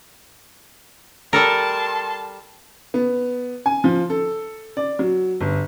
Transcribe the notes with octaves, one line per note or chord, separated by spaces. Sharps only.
G3 A4 A#4 A5 C6
B3
G#5
F3
A4
D5
F#3
G1